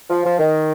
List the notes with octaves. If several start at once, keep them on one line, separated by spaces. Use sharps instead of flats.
F3
F3
D#3